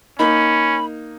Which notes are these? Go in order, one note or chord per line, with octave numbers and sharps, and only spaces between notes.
A#3 C#4 D#4 B5